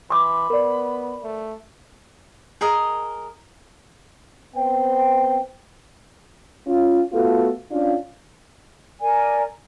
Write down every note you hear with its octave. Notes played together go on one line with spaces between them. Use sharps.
E3 B5 C6 D6
B3 A#4 D5
A3
G#4 A#4 D#5
B3 C4 C5 G5
C#4 F4
A3 B3 F4 F#4 A4
C#4 D4 F4
A#4 D5 G#5